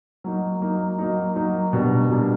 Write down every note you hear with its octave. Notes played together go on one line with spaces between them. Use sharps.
F#3 A#3 D#4
F#3 A#3 D#4
F#3 A#3 D#4
F#3 A#3 D#4
B2 G3 A#3 D4
B2 G3 A#3 D4